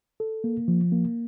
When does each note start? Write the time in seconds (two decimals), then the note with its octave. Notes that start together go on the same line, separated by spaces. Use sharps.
0.20 A4
0.44 A#3
0.68 F3
0.92 A#3